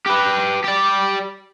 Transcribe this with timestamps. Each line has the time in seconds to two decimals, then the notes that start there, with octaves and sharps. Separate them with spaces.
0.06 G4 B4
0.64 G4 D5